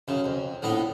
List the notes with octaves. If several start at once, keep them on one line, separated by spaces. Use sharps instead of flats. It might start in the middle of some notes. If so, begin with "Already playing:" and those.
F#2 C#3
F2
A#1 A2 B3 D#5